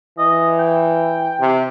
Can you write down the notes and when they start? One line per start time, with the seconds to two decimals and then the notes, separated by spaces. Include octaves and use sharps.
0.18 E3 D#5
0.59 G5
1.40 C3